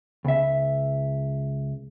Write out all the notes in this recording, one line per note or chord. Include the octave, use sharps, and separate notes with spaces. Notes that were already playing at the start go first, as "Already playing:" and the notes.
C#2 E5